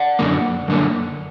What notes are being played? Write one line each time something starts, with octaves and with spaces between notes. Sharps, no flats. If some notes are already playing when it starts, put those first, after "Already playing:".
Already playing: D5 F#5
F#2 D3 A#3
F#2 D3 A#3